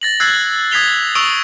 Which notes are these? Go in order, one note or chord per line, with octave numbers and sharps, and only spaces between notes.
A6 A#6 F#7
E6 F#6 G#6 A6 C7
D#6 G#6 B6 C7 F7 G7
C#6 D#6 E6 D7 F7 G7